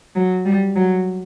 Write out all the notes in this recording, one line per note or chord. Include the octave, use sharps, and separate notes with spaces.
F#3
G3
F#3